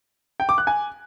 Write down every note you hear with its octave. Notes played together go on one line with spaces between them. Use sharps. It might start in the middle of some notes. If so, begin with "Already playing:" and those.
G5
D6
F#6
G#5